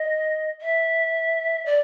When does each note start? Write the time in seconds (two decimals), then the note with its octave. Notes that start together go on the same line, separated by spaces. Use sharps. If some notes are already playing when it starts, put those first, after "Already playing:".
Already playing: D#5
0.61 E5
1.66 D5